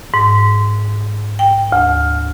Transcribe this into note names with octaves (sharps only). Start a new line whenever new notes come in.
G#2
G5
D2